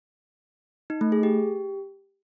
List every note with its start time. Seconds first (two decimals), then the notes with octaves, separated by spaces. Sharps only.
0.90 D#4
1.01 A3
1.12 G#4
1.23 G4